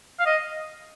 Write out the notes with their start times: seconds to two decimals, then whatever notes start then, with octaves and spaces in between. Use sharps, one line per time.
0.20 F5
0.26 D#5